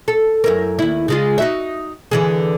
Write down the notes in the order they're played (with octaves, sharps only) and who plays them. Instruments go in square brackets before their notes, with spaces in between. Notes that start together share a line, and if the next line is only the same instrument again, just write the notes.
[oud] A4
F#2 E4 A#4
D#2 E4
C#3 G#3 F4
D#4 F#4 E5
D3 E3 G#4